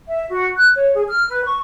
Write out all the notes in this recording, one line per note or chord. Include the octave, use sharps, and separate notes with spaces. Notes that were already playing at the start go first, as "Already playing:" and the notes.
E5
F#4
F#6
C#5
G#4
F6
B4
C#6